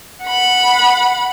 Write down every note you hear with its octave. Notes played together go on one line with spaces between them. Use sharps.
F#5 B5